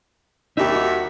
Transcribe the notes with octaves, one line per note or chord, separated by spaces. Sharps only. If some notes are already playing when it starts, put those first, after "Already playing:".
D#2 G3 D#4 G4 E5
F#4